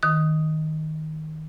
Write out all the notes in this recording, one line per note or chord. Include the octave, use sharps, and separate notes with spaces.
D#3 D#6